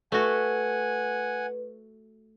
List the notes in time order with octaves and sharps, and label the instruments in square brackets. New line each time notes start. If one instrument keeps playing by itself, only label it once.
[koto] A3 F#4 [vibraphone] B4 [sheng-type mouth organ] F#5 G#5